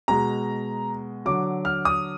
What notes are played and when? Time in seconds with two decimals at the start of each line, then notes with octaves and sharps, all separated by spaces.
0.08 B2 G#3 A#5
1.26 D3 F#3 D6
1.65 F6
1.85 D#6